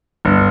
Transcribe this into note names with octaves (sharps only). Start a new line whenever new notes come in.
G1